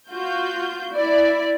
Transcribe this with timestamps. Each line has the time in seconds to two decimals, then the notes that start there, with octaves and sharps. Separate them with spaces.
0.11 F4 F#4 G6
0.94 E4 D5